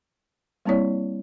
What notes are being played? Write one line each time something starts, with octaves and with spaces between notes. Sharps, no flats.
G3 A#3 C4 E4 C#5 D5